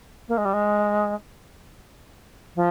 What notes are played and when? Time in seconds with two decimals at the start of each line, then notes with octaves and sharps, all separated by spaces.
0.28 A#3
0.37 G#3
0.45 G3
0.53 G#3
2.55 F3